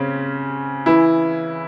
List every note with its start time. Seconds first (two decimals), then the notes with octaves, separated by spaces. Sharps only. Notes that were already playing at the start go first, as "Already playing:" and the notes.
Already playing: C#3 C4 C#4
0.86 E3 E4